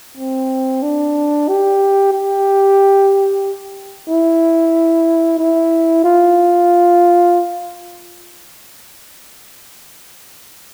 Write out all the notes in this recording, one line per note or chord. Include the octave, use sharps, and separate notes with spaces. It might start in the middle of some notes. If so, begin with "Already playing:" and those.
C4
D4
G4
G4
E4
E4
F4